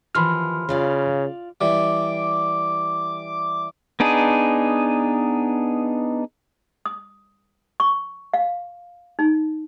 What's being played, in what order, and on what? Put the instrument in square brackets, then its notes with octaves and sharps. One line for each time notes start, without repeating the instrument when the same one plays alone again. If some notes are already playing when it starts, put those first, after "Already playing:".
[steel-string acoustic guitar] D#2 E3 F3 [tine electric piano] B5 C6 F6
[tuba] C#3 [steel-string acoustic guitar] F4 D5 F5
[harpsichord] E3 G3 [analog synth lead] D6
[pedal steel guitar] B3 D4 D#4 G#4
[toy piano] D#6
C#6
F5
D#4